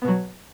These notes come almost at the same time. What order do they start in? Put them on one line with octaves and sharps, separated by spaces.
B3 B2 F#3